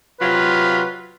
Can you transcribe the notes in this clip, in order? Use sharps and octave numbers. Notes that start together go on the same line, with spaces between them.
C3 F#3 F4 B4